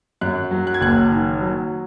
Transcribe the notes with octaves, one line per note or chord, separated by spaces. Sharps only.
F#2 F#6
F#3
F#6
G#6
F#1 F#6
D#3
F#3